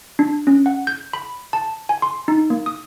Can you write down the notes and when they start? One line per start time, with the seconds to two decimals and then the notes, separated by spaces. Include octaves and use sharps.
0.19 D4
0.47 C#4
0.66 F#5
0.87 G6
1.13 B5
1.53 A5
1.89 G#5
2.02 C6
2.28 D#4
2.50 A#3
2.66 D#6